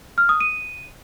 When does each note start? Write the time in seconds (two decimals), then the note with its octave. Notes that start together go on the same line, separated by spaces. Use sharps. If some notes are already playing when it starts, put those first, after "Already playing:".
0.18 F6
0.29 D#6
0.40 D#7